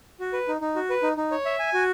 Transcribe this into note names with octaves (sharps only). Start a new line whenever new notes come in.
F#4
B4
D#4
D#4
F#4
B4
D#4
D#4
C#5
E5
G#5
F#4